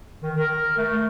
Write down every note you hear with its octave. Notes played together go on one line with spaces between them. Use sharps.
D#3
A#4
A3